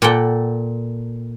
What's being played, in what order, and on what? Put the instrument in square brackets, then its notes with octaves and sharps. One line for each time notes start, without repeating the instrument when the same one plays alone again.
[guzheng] A#2 A4 F#5 G5